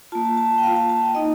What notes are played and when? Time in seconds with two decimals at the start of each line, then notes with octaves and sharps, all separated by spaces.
0.12 A#3 F4 A5
0.25 A5
0.37 A5
0.51 A5
0.58 G5
0.63 A#3 F5
0.67 F4
0.76 A5
0.89 A5
1.02 G5
1.15 A#3 D#4 D#5